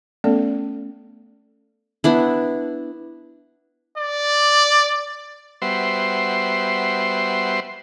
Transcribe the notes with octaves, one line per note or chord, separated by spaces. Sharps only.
A3 B3 C#4 A4 D5
B3 D4 E4
D5
G3 B3 F#4 C5 E5 C6